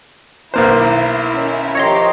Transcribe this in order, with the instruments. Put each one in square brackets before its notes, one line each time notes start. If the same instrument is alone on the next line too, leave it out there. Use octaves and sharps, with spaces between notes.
[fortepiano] B1 A#3 C5 [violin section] E4 A#5
[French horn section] D#3 C#4
[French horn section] F3 D#5 [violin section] G4 A#4 [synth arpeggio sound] C#5 A#5 C6